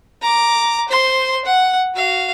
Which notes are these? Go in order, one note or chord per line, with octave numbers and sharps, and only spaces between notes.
A#5 D6
C5 C6
F#5
F#4 F5